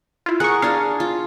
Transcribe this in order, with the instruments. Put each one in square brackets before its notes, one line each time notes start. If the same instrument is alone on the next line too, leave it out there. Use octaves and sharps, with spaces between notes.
[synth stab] E4 F4
[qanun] G#4 A#4 [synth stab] F#5 C#6
[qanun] D4 G#4 [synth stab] F5
[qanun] F4